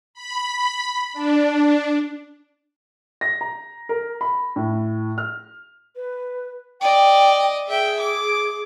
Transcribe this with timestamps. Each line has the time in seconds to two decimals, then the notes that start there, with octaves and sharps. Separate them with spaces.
0.14 B5
1.13 D4
3.21 A#6
3.41 A#5
3.89 A#4
4.21 B5
4.56 A2
5.18 F6
5.96 B4
6.81 D5 D#5 G5
7.68 G#4 E5 G5
8.01 D6